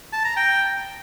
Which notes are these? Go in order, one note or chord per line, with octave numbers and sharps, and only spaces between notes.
A5
A#5
G5